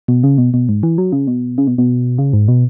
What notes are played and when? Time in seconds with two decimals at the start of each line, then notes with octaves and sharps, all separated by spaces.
0.08 B2
0.23 C#3
0.38 B2
0.54 B2
0.69 G#2
0.83 E3
0.98 F#3
1.12 C#3
1.28 B2
1.58 C#3
1.67 B2
1.78 B2
2.18 C#3
2.33 G#2
2.48 B2